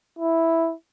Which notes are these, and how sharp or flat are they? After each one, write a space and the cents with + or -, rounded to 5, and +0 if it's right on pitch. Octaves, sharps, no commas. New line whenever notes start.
E4 -5